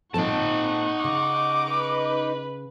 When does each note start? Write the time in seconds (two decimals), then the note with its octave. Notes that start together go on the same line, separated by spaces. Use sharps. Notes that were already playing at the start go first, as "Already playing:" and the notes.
0.14 A#2 C4 D#4 A4 F#5 A5 C#6
1.04 C#3 D6
1.71 B4